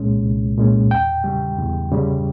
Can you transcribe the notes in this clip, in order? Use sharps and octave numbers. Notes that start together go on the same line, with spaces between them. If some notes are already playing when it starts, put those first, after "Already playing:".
Already playing: C2 A#2 G#3 C#4
C2
A#2 G#3 C#4
E2 G5
C#3 G3
E2
C#3 G3